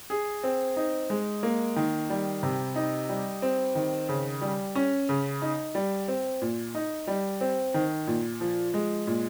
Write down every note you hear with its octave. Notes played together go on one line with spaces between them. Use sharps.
G#4
C4
D#4
G#3
A#3
D#3
G3
C3
D#4
G3
C4
D#3
C#3
G3
C#4
C#3
D#4
G3
C4
A#2
D#4
G3
C4
D#3
A#2
F3
G#3
A#2